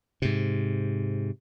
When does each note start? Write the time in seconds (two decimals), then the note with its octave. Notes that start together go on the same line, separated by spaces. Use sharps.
0.22 G#2 C3